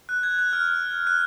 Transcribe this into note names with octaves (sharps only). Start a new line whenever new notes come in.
F#6
G#6
F#6
F6
F#6